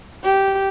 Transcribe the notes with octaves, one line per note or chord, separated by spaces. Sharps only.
G4